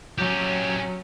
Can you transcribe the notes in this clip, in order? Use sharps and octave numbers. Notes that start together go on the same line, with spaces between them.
F#3 C#4 G4